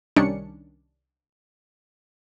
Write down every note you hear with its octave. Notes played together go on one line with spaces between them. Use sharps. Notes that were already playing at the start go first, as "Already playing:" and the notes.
C2 D#3 G3 C#4 D4 C#7